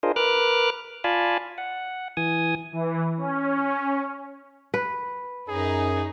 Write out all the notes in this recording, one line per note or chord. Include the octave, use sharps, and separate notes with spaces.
D4 F4 G#4 A#4 C5 D#5
A#4 B4 D6 F6 F#6
F4 D5 F5 G#5 A5 B5
F#5
E3 G#5 D#6
E3
C#4
B4
F#2 C#4 D#4 G#4